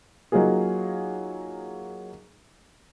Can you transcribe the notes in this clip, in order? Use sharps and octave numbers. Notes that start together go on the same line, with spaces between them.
F#3 A#3 D#4 F4 G#4